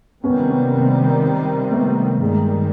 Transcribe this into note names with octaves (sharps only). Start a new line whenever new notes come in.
C3 D#3 G3 B3 C#4
B3 C#4
A#3 C4
A3 B3
G2 D#3 G3 G#3 A#3